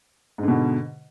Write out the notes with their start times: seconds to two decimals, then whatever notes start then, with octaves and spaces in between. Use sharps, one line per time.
0.38 G#2
0.43 D3
0.48 B2